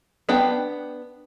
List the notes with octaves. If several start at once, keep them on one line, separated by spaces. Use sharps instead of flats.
B3 D4 G5